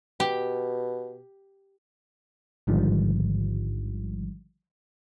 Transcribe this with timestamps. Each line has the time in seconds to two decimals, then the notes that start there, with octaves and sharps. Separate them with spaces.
0.20 B2 G4
2.67 A1 G#2 D3 D#3 F3 G3